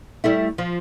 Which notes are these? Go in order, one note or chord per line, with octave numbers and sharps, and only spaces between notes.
G3 A3 E4
F3